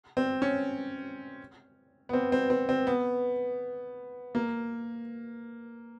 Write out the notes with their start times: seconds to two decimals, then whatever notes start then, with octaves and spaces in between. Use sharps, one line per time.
0.17 C4
0.42 C#4
2.09 B3
2.13 C4
2.32 C4
2.50 C4
2.69 C4
2.87 B3
4.35 A#3